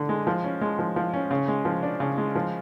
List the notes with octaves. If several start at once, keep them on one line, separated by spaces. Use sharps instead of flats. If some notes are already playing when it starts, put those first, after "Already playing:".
Already playing: D3 D4
G#3
F3
C#4
G#3
F3
F3
C#4
C#3
G#3
F3
D4
C#3
G#3
F3